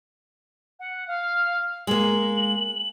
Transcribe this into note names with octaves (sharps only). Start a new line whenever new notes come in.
F#5
F5
G#3 A#3 F#7